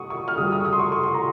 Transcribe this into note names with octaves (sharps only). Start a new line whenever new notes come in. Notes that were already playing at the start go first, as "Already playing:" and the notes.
Already playing: C#6 D#6
C#6
F6
C#3 G3 D#6
D#6
C#6
D#6
C6
C#6
C#6
C6
A#5